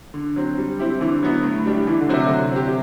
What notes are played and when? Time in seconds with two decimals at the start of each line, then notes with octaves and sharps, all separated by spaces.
0.14 D3
0.36 F#3 C4
0.58 G3
0.79 C4 E4 G4
1.01 D3 E3
1.23 F#3 B3 E4
1.44 A2
1.66 G3 D4 G4
1.87 D3 E3
2.01 D3
2.09 C3 F#3 C4 F#4
2.27 D3 F#3
2.52 C4 G4
2.67 C3